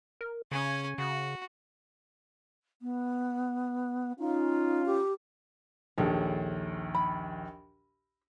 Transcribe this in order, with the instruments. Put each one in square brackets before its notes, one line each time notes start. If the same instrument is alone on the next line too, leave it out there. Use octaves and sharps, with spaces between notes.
[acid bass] A#4
[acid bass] C#3 [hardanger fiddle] C#4 G#5
[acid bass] C#3 [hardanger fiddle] F#4
[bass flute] B3
[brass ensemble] C#4 F4 [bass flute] D#4
[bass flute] G4
[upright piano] A#1 D#2 [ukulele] G#4 A4 C#5
[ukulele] B5